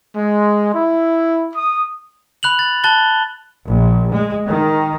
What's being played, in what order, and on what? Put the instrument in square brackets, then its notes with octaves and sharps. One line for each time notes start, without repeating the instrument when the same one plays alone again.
[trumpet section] G#3
E4
D#6
[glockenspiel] B5 F#6 F7 F#7
A6
A5 F#6 A6 G7
[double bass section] A#1
G#3
D#3